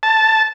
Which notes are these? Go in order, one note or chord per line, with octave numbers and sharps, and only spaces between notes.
A5